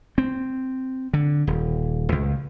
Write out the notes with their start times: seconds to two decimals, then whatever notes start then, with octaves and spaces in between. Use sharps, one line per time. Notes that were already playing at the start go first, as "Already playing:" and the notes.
0.18 C4
1.13 D3
1.47 D#1
2.12 C#2